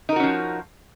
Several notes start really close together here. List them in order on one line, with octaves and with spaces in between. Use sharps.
D#4 A#4 F#4 C#4 F3